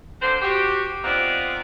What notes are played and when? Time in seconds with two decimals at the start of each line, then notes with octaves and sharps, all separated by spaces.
0.22 D3 C5
0.42 F#4 G4
1.04 B3 C4 D#4 F4 D5